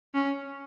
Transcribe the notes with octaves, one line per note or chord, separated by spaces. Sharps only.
C#4